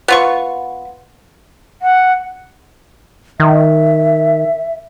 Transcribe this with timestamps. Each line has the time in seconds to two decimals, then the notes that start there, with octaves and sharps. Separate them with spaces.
0.08 B3 F4 C#6
1.82 F#5
3.40 D#3 E5